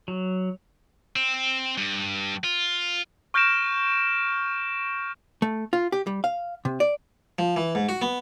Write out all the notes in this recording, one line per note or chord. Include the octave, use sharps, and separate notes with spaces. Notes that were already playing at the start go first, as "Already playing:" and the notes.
F#3
C4
G2
F4
C#6 F6 G6 A#6 D7 E7
A3
F4
G4
G3
F5
C3
D5
F3
E3
G#2
F#4
B3